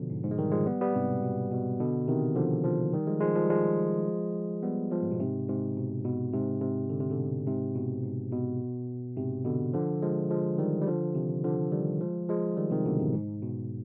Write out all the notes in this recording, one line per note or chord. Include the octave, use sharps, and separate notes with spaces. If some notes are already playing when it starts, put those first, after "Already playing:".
Already playing: B2 D3 F3
G#2
G#2
G#3
D#3 G3
F3 G#3
G3 B3
G3 B3
G#2 C3
B2
B2
B2
B2 D3
C3 D#3
D3 F3
D3 F3
D#3 G3
F3 G#3
F3 G#3
F3 G#3
G3
F3 G#3
G3 B3
F3 G#3
G#2
B2
G#2 C3
G#2 C3
B2
B2
G#2 C3
G#2 C3
D3
C3
B2 D3
G#2 C3
B2
G#2
B2
G#2 C3
B2 D3
D3 F3
F3 G#3
F3 G#3
D#3 G3
G3
D3 F3
C3 D#3
D3 F3
D#3 G3
F3 G#3
F3 G#3
D#3 G3
C3 D#3
B2 D3
G#2 C3
G#2
B2